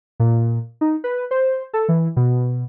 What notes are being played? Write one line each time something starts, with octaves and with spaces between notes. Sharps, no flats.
A#2
D#4
B4
C5
A4
E3
B2